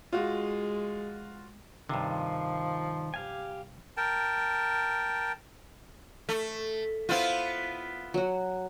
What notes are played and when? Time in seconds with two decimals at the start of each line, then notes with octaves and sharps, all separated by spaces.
0.13 G#3 F4 F#4
1.89 G2 C3 D#3 F3 F4
3.14 G4 F5 G#5
3.97 A#4 G5 A5
6.29 A3
7.09 B3 E4 F4 C5 F5 C6
8.14 F#3 F#4